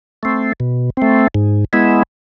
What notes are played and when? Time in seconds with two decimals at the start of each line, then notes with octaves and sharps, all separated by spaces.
0.23 A3 C4
0.60 B2
0.97 A3 C4
1.35 G#2
1.73 G#3 B3 E4